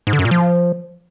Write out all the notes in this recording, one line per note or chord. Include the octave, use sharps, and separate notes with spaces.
G#2
D3
F#2
A#2
F3